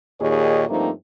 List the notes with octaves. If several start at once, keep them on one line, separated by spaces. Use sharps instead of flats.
D#2 A#2 D#3 G#4 C#5 D#5
G2 F3 A3 A#3 C4 D#4